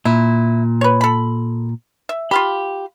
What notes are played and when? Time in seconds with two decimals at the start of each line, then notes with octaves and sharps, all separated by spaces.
0.05 A#2 E4
0.81 B4 C#5
1.01 A4 B5
2.09 E5
2.31 F4 G4 F5 B5